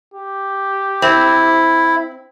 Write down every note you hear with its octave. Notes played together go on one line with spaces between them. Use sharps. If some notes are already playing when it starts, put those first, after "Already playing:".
G4
C4 E4